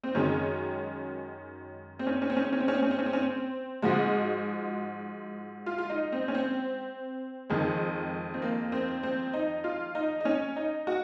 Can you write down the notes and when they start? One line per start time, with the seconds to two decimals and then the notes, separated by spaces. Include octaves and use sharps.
0.03 C4
0.15 F#2 D#3 G#3 C#4
1.99 C4
2.07 C#4
2.14 C4
2.22 C#4
2.30 C4
2.36 C#4
2.44 C4
2.52 C#4
2.60 C4
2.68 C#4
2.75 C4
2.82 C#4
2.91 C4
2.99 C#4
3.06 C4
3.13 C#4
3.21 C4
3.82 G#2 F3 G#3 F#4
5.66 F4
5.78 F4
5.89 D#4
6.12 C4
6.28 C#4
6.35 C4
7.50 F2 D#3 G#3
8.34 C4
8.42 A#3
8.72 C4
9.03 C4
9.33 D#4
9.64 F4
9.95 D#4
10.20 D#4
10.25 C#4
10.56 D#4
10.87 F#4